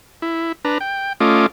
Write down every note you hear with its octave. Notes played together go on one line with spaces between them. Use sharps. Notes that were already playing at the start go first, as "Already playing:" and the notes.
E4
D4 B4 A#5
G5
A3 C#4 F4 D#5 D6